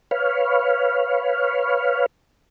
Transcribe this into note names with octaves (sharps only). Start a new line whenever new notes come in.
B4 C#5 F5